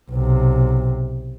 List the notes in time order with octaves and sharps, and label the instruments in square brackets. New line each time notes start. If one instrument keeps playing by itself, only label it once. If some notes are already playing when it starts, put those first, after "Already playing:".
[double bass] B1 C3